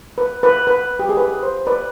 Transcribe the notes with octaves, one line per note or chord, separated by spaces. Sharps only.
B4
B4
B4
G4
G#4
B4
C5
B4 D5